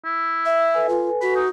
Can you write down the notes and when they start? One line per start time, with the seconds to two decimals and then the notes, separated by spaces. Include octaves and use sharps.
0.05 E4
0.46 E5
0.74 A4 B4 G#5
0.89 F4
1.22 F#4 B5
1.35 D#4